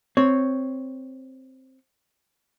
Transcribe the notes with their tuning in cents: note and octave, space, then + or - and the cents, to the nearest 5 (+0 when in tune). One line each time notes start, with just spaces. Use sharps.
C4 +0 C#5 +0